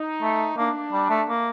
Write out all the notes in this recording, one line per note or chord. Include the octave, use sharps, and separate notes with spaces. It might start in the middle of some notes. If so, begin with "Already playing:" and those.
Already playing: D#4
A3
A#3 D4
G3
A3
A#3